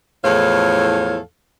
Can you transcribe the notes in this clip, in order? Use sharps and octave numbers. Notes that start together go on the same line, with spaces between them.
E2 A2 F3 A4 C#5 F5